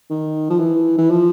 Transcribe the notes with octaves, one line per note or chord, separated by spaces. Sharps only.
D#3
F3
E3
E3
F3